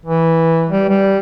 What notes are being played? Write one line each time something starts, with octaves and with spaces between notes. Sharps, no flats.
E3
G3
G3